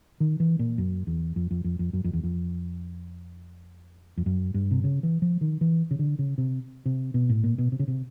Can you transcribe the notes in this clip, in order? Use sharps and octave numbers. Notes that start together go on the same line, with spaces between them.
D#3
E3
A#2
F#2
E2
F2
F2
F2
F2
F#2
F2
E2
F2
F2
F#2
G2
C3
C#3
E3
F3
D#3
E3
C#3
D3
C#3
C3
C3
B2
A2
A#2
B2
C3
C#3
C3